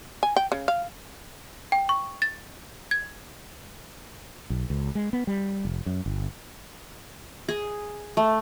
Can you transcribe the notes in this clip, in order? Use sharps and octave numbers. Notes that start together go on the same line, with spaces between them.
G#5
G5
C#3
F5
G5
C#6
A6
G#6
B1
C#2
G#3
B3
G3
F1
F#2
G1
G#4
A3